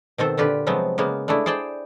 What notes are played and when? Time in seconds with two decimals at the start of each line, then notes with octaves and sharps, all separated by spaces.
0.18 B2 D#3 C4 A4
0.37 A#2 D3 F4 G4 B4
0.67 C3 F3 F#3 G#3 B3 C4
0.98 C#3 G#3 A#3 B3
1.28 G#3 A3 D4 E4
1.46 G#4 C5 D5 G5 A5